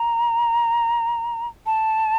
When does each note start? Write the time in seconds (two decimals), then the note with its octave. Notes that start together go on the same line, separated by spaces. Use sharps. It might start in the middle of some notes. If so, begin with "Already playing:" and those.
Already playing: A#5
1.66 A5